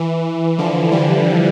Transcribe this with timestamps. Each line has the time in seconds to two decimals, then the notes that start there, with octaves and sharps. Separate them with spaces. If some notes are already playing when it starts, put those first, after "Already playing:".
Already playing: E3
0.58 D3 F3
0.92 E3 G3